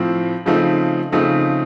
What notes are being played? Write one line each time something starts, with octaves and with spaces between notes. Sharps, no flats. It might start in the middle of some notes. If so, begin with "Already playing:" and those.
Already playing: A2 F3 C4
C#3 F3 A3 C4 D#4
C#3 F3 A3 C4 D#4